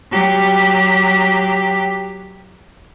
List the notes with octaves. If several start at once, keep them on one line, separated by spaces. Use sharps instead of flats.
F#3 G4